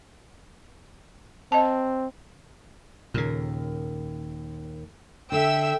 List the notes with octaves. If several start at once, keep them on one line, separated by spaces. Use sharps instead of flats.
C4 D#5 A5
D#2 A#2 C#3 A#4
D3 E5 G5 E6